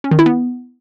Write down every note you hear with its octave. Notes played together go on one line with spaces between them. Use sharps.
C#4
D#3
E4
B3